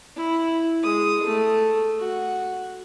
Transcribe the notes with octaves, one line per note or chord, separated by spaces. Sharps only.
E4
G#3 D#6
A3 A4
F#4